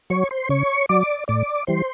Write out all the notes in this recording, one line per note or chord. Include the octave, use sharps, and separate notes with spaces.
F#3 C#5 C#6
C5 C6
C#3 C#5 C#6
F#3 D5 D6
A2 D5 D6
E3 G3 C5 C6